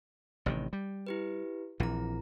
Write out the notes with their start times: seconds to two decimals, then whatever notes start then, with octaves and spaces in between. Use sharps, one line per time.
0.46 A1 C3 D#3
0.73 G3
1.07 E4 G4 B4
1.80 A#1 E3 C4 E4 A#5